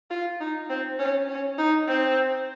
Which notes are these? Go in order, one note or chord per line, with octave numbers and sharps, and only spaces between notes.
F4
D#4
C4
C#4
C#4
D#4
C4